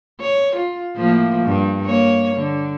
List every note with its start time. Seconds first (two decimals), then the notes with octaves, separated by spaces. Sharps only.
0.21 C#5
0.55 F4
0.95 A2 F3 A#3
1.43 G2
1.85 A#3 C#5
2.35 D3